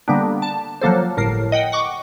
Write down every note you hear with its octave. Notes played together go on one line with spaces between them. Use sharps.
D3 G3 A#3 B3 D4
A5
F3 F#3 A#3 A4 C5
G1 A2 A#4 C7
D#5 F#5 G5
F#5 C#6 D6